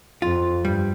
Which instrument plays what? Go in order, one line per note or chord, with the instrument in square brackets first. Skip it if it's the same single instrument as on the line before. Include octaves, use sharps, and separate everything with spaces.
[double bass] F2 [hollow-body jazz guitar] F4
[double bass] G2 [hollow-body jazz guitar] G3